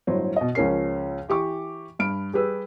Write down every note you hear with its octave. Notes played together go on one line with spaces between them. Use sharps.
G1 A2 F#3 C5
B2 D#5
C#2 F3 C#4 A#4 C7
E3 G4 C#6 D6
G2 B5 F6 D7
G3 G4 G#4 B4 E6